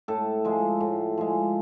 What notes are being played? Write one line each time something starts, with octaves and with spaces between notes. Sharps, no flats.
A2 A4
F3 G#3
A2
F3 G#3